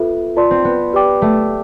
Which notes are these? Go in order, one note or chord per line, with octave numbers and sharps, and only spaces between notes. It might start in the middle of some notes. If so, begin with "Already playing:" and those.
Already playing: B3 F4 A4 E5
F4 B4 D5 A5 C6
C4
B3
G4 B4 D5 G5 D6
A3